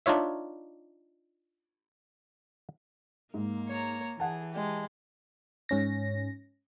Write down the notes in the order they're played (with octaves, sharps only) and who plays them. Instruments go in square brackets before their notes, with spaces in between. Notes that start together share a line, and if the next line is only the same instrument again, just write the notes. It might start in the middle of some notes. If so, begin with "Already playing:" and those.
[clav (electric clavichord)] D4 D#4 F4 C#5 E5
[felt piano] G#2 [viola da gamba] A#3
[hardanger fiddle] C#5 A#5
[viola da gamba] E3 [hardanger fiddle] G#4 [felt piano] F#5 A5
[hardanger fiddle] G#3 G4
[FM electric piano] G#2 C#4 A#6